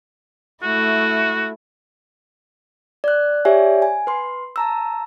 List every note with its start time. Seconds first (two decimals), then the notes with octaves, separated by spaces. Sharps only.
0.63 A3 E4 F#4
3.04 D5 F#6
3.45 G4 C#5 D5 E5 G#5
3.82 G#5
4.07 B4 C6
4.56 A5 A#5 E6